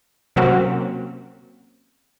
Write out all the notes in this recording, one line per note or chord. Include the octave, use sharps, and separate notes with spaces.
C3 F#3 A#3 C4 C#4 F#4